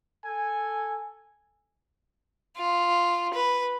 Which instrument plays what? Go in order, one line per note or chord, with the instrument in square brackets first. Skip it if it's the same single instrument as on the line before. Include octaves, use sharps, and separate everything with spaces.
[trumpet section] A4 G#5
[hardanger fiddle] F4
B4